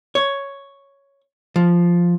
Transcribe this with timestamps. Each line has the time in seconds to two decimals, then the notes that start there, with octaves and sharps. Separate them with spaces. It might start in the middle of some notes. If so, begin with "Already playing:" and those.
0.15 C#5
1.56 F3